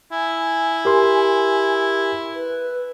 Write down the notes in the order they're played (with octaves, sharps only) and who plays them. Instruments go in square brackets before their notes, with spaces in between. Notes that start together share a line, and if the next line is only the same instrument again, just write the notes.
[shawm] E4 [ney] G#5
[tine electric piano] G4 A#4 C6
[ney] B4